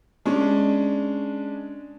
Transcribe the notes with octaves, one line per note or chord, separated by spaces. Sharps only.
G#3 C#4 D4